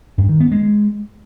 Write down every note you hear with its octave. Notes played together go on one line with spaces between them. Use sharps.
G2
D#3
B3
G#3